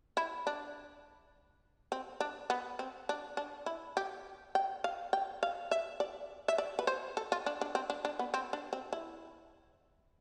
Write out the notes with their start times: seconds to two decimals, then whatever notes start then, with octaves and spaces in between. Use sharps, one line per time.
0.17 E4
0.47 D4
1.92 C4
2.20 D4
2.50 B3
2.79 C4
3.09 D4
3.37 D4
3.66 E4
3.97 G4
4.55 G5
4.84 F5
5.13 G5
5.43 F5
5.71 E5
6.00 D5
6.48 E5
6.58 D5
6.79 B4
6.87 C5
7.17 A4
7.32 F4
7.46 D4
7.61 D4
7.75 C4
7.90 D4
8.05 D4
8.19 B3
8.34 C4
8.53 D4
8.73 C4
8.93 E4